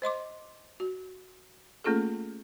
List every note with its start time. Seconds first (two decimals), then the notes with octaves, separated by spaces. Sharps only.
0.02 C5 D#5 C6 D6
0.80 F#4
1.84 A3 A#3 C#4 F4 G#4 A4